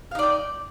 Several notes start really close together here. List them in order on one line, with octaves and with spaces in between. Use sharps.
F5 D#4 D5 G5